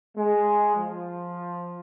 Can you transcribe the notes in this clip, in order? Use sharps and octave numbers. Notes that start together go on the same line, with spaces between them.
G#3
F3